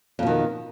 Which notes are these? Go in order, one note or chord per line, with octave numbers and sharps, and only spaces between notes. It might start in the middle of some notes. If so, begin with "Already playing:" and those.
F2 B2 D#3